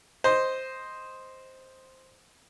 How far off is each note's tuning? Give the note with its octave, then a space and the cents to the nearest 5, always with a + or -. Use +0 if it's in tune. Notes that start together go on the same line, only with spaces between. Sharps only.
C5 +0 D#5 +0